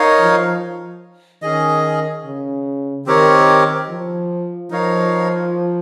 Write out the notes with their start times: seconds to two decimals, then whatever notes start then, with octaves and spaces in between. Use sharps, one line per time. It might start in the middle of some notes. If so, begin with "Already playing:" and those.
Already playing: D#4 A#4 C#5 F5
0.20 F3
1.42 D#3 C#4 G#4 D#5
2.25 C#3
3.06 D#3 C4 G4 A#4 C#5
3.89 F3
4.71 F3 D#4 A#4 C#5 F5